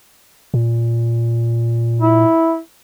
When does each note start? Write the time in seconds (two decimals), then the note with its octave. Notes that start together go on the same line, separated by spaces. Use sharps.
0.54 A#2
2.02 E4